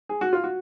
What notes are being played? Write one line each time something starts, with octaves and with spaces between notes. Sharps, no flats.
G#4
F#4
F4
F#4